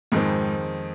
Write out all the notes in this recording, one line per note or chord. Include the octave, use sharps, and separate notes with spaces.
F2 G#2 D#3 G#3 C4